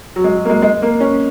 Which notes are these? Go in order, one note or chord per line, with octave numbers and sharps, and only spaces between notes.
F#3
G#3
F#3
A#3
G#3
G#3
A#3
C#4